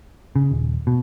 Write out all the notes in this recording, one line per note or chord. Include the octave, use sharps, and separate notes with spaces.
C#3
D#1
B2